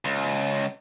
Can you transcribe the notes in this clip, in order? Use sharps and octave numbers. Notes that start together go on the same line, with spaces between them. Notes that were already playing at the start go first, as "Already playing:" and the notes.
C#2